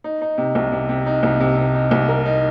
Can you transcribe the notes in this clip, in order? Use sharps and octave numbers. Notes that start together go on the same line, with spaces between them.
D#4
D#4
C3
C2
C3
C3
D#4
C2
C3
C3
D#4
C2
A#4
D#4